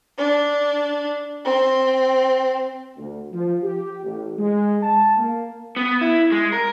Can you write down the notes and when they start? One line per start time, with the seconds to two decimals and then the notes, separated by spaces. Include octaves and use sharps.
0.18 D4
1.44 C4
2.97 D2
3.33 F3
3.63 G4
4.04 A1
4.38 G#3
4.83 A5
5.16 A#3
5.76 B3
6.01 E4
6.32 G#3
6.52 A#4